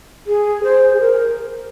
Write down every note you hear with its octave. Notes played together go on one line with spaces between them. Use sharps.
G#4
C5
G#4
A#4